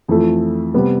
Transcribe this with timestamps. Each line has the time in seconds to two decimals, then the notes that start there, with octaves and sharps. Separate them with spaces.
0.08 F2 E3 A3
0.74 C3 G3 B3